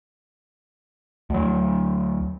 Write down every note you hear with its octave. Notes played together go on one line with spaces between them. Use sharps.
D2 F#3